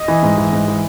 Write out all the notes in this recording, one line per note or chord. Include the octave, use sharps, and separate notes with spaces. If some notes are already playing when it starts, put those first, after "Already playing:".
Already playing: D#5
E3
G#2
E3
G#2
E3